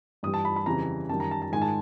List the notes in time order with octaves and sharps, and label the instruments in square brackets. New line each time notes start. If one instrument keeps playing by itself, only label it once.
[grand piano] G2 E3 G3 D#6
A5
B5
B5
F2 C#3 E3 G3 A#5
F#2 D#3 G3 A5
A#5
A5
A5
G#2 D#3 G#3 G#5
A5